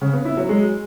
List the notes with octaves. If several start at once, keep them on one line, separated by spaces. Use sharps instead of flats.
C#3
B3
E4
F#3
G#3